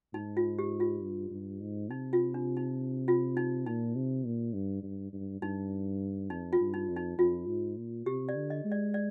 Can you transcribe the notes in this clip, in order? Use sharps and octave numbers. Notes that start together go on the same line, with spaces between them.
G#2 D#4
F4
G4
F4
G2
G2
G#2
C3 D#4
F4
D4
D#4
F4
D#4
A#2 D#4
C3
A#2
G2
G2
G2
G2 D#4
F2 D#4
F4
G2
D#4
F2
D#4
F2 F4
G#2
A#2
C3 G4
D5
D3
D#5
G#3
D5
D5